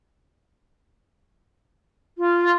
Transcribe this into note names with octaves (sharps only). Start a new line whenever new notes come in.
F4